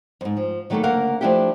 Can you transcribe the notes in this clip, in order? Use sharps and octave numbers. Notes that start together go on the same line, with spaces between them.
F2 G#2
F3
D#3 F#3 A3 A#3 E4 A4
D2 C#3 A#3 A#4 F5 F#5
F3 A3 D4 E4 F4 G4